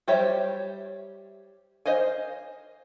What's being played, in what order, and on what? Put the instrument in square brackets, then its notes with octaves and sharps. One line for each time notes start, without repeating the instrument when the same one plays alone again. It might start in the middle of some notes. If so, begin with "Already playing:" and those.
[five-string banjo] G3 G4 C5 C#5 E5
C5 D#5 F5 G#5